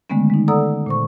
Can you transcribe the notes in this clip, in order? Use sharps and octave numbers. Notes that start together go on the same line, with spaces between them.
D3 D#3 G#3 A3 B3 C#4
G#3 D#4
A4 D5 F#5 A#5 D#6 E6
A#2 C5 C#6